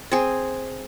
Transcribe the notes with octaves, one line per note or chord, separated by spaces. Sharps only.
C4 G#4